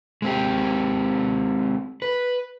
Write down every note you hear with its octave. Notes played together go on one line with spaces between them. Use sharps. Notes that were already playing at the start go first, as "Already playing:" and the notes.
G#3 C4 G4
B4